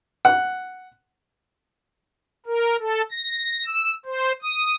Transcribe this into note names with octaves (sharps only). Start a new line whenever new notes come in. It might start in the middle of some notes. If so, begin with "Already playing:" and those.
F#5
A#4
A4
A#6
E6
C5
D#6